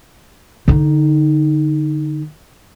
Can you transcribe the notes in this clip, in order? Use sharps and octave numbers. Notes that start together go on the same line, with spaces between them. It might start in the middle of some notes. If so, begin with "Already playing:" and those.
D3 D#4